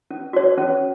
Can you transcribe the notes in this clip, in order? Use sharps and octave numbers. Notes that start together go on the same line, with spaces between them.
C#4
F#4 C#5
C#4